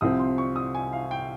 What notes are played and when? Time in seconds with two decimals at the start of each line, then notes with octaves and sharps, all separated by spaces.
0.01 C2 C3 F3 C4 D#6
0.19 C6
0.38 C#6
0.56 D#6
0.75 G#5
0.93 F5
1.11 G5